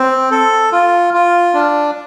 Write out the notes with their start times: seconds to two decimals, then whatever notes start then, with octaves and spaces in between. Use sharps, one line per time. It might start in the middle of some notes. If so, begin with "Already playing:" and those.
Already playing: C4
0.31 A4
0.72 F4
1.14 F4
1.54 D4